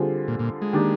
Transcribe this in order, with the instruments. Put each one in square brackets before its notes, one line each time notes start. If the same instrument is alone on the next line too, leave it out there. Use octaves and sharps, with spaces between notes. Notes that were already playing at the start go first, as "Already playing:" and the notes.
Already playing: [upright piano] D3 G3 C4 F4 G#4
[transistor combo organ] A#2
A#2
G#3
[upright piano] D#3 A#3 D4 G4